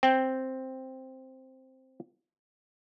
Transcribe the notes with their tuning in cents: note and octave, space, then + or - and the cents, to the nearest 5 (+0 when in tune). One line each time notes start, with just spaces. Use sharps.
C4 +0 G5 +0